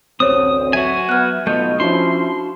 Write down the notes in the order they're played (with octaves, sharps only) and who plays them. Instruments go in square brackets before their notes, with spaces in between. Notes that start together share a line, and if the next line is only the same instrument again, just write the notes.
[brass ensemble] A1 D2 [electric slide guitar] C4 [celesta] C5 C#5 [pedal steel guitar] D#6
[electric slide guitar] F#3 E5 [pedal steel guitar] F#4 G#5
[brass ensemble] B3 [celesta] F6 F#6
[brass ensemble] B1 D#5 [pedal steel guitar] A3 B3 F4 [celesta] G6
[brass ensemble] F3 C#4 E4 [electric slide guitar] D4 F#4 [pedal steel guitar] C6